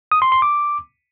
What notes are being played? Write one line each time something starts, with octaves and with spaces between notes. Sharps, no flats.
D#6
C6
C6
D6